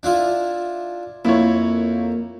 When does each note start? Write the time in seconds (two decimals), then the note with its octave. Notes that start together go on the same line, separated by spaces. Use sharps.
0.03 D4 E4 F4
1.25 F2 A#3 E4 C#5